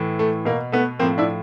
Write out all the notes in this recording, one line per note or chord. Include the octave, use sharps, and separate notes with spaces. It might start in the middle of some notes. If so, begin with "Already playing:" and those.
Already playing: A2 E3
A3
B2 A#3
A3 B3
A2 F3 A#3 C4
D4 E4